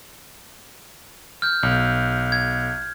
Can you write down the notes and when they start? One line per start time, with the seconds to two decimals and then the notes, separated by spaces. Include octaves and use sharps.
1.42 F6 G6
1.63 B1
2.32 G#6